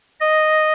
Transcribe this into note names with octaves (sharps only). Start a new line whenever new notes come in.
D#5